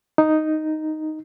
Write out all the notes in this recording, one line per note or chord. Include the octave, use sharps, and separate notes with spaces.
D#4